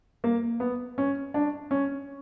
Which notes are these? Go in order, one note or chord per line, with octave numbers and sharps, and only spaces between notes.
A#3
B3
C#4
D4
C#4